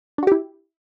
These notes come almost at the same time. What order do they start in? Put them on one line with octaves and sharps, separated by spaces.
D4 F#4 G4 E4